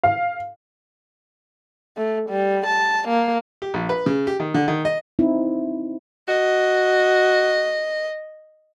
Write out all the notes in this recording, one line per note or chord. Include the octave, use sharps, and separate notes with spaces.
F5
A3
G3
A5
A#3
G4
A#1
B4
C#3
G4
D#3
D3
D#3
D#5
C4 D#4 E4
F#4 D#5